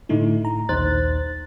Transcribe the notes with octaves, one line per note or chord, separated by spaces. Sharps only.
A2 D3 A3 D#4 E4
A#5
A#1 D#2 D#4 C5 F#6 A6